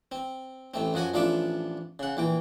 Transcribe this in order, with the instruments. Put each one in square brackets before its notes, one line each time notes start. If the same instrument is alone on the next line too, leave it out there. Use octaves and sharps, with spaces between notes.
[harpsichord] C4
A1 A3 C4
F#2 F3 F#4 G#5
A1 F3 D4 F4 E5 D6
C#3 F#5
A#1 E3 G5